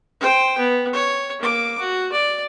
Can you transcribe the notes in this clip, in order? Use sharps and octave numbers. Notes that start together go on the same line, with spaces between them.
C5 G5
B3
C#5
A#3 D6
F#4
D5